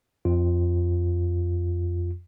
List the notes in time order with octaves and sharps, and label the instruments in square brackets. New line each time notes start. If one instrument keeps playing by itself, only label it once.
[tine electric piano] F2 F4